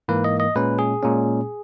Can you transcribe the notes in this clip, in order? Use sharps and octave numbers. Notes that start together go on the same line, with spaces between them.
G#2 E3 A#3 B4
D#5
D#5
A#2 G#3 C#4 B4
G#4
A#2 G#3 C#4